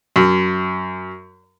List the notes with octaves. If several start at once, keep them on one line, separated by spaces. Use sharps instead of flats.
F#2